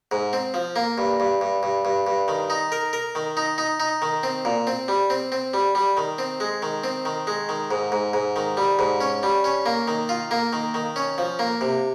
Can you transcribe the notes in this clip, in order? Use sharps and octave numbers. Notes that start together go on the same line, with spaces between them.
G#2
C4
F3
A#3
G2
G2
G2
G2
G2
G2
D#3
D#4
A#4
A#4
D#3
D#4
D#4
D#4
D#3
C4
A#2
C4
G3
C4
C4
G3
G3
D#3
C4
G#3
D#3
C4
D#3
G#3
D#3
G#2
G#2
G#2
D#3
G3
G#2
C#4
G3
C#4
A#3
D#3
F4
A#3
D#3
D#3
C#4
F3
A#3
C3